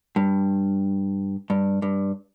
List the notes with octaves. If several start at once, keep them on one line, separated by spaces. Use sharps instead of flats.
G2
G2
G2